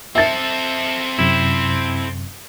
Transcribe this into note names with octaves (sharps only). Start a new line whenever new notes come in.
C4 A4 E5 A6
F#2 C3 E4